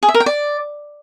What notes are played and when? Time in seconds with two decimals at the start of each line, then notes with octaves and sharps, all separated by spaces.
0.03 G#4
0.09 E5
0.14 A#4
0.20 G5
0.26 D5